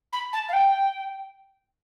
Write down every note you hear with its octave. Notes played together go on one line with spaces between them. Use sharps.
B5
A5
F5
G5